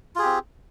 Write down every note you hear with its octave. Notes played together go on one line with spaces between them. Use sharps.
C4 F4 G4 G#4